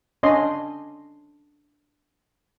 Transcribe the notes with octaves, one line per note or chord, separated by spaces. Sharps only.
C#4 D4 D#5 C6